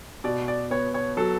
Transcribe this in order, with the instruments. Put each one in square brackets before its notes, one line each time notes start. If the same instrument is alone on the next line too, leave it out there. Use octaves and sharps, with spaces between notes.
[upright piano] B2 [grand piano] D5
[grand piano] D5
[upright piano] B3 [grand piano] C#5
[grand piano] C#5
[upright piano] F#3 [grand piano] A4